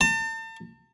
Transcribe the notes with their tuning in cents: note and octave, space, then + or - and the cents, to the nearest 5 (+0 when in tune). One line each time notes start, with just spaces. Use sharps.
A5 +40